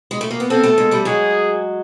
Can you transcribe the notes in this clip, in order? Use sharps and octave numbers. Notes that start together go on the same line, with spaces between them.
G#3
A3
A#3
B3
A#3 C4 A4
A3 B3
G#3 A#3
G3 A3
F#3 G#3 G#4